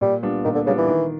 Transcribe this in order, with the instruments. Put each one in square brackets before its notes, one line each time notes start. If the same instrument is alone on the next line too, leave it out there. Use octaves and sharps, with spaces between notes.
[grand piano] A#2 [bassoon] G3
[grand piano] G3 B3 D4 F4
[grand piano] A#2 [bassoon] D#3
[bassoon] D3
[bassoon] C#3 [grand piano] G3 B3 D4 F4
[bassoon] E3
[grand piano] D#3